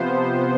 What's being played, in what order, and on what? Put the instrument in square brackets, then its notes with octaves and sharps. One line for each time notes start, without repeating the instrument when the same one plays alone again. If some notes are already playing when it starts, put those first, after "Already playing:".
Already playing: [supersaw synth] C3 F3 B3 C5